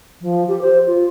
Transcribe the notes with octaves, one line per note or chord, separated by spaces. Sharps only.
F3
G4
C5
F4